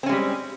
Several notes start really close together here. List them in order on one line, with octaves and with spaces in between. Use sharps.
C4 C#4 G#3 G3